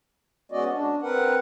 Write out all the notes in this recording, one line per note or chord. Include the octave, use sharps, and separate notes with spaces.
G#3 B3 C#4 F#4 D5 D#5
D4
C4 A#4 B4 F#5